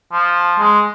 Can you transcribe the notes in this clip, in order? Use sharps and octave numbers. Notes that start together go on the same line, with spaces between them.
F3
G#3